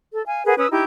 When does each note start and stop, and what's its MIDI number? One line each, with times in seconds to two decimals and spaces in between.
0.12 0.25 69
0.26 0.45 77
0.26 0.45 80
0.46 0.53 68
0.46 0.53 70
0.46 0.53 71
0.46 0.53 78
0.57 0.68 61
0.57 0.68 71
0.57 0.68 87
0.57 0.68 88
0.71 0.84 63
0.71 0.84 64
0.71 0.84 67
0.71 0.84 91